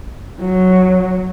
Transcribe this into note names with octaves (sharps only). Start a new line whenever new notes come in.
F#3